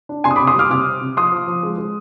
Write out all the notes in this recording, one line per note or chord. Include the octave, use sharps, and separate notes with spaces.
D4
C3 G#5 C6
D#6
B5 D6
C3
C6 D#6
G3 D6 F6
C3 D6 F6
C4
C3
F3 C6 D#6
F3
F3
G#3
G#3